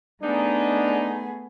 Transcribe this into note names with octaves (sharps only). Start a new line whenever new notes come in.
A3 B3 D4 D#4 G#4